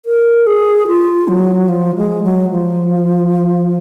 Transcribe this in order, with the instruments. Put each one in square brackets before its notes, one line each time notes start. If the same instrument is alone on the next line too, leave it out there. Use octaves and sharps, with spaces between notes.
[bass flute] A#4
G#4
F4
F#3
F3
G#3
F#3
F3